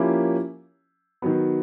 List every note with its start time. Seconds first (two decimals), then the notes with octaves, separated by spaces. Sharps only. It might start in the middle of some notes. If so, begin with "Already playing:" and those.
Already playing: F3 A#3 C#4 E4 G4
1.22 D#3 F#3 B3